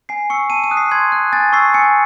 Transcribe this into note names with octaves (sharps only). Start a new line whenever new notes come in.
G#5 C7
C#6 E6 C#7
A5 D#7
D#7
D#6 F#6
C7
C6 G#6
F#6
G#5 A6
C#6 E6 C7
G#5 C#7